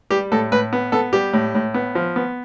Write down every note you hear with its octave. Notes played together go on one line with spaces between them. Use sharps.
G3 G4
A2 A4
A2 B4
B3
B3 A4
G3 G4
A2
A2
B3
F3
B3